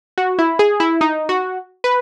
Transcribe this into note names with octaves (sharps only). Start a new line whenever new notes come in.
F#4
E4
G#4
E4
D#4
F#4
B4